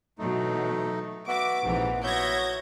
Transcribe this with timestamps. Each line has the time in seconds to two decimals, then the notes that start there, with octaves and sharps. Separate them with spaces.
0.19 B2 E3 F#3 A3 D#4
1.28 B3 F#4 E5 D6
1.64 A#1 G#2 C3 E3
2.03 F#3 B3 C#5 E5 G6 G#6 A#6